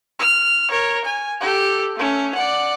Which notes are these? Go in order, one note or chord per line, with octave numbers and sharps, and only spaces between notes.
F6
A#4 C#5
G#5
G4 A4
A3 C#4
D5 F#5